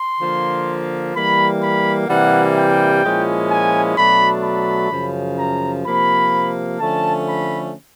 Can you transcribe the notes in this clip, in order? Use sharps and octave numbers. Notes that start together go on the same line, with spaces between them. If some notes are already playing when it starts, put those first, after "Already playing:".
Already playing: C6
D3 F3 A#3
E3 G3 A#3 B5
B5
C3 E3 G3 A#3 F#5
G5
A#2 F3 G#3 C#4 E4
G#5
B2 F#3 A3 D4 B5
B5
F#2 C#3 F3
A#5
C3 F3 A#3 B5
D3 F3 A3 C#4 A5
B5